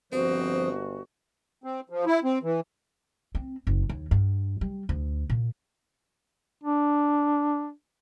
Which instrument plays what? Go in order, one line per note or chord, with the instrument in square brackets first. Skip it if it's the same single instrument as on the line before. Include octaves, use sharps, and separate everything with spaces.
[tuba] G1 [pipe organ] F3 C5 D#6 [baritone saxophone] C4 [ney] F#4
[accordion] C4
F3
E4
C4
E3
[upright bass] C4
F#1
D#2
G2
G3
D2
A#2
[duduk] D4